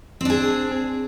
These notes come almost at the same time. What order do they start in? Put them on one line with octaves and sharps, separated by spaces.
C4 D4 G#4